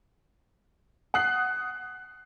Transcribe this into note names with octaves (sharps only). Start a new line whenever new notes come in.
F#5 D#6 F#6 C7 F#7